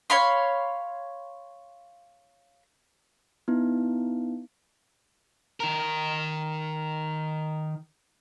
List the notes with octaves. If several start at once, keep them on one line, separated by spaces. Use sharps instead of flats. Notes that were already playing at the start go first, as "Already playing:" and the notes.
C#5 F5 B5 C6
B3 D#4 E4
D#3 A#4